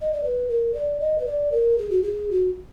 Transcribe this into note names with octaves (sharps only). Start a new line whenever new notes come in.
D#5
D5
B4
A#4
D5
D#5
B4
D5
A#4
G#4
F#4
G#4
F#4